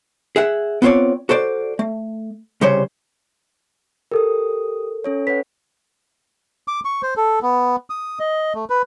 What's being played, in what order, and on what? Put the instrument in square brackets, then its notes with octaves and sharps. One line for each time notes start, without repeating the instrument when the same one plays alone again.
[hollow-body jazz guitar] G#4 E5 F#5
B3 C4 F4 G#4 C#5 D5
F#4 A4 C5 D5
A3
C2 C#3 G3 C5 C#5
[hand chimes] G4 D#6 [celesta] A4 A#4
[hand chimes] C#4 A4 C#5
[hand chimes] B4 C#5 F#5 [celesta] B6
[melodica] D6
C#6
C5
A4
B3
D#6
D#5
A3
B4